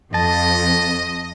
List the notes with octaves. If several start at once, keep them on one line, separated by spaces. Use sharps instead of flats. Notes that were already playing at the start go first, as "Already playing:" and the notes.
F2 D#5 A5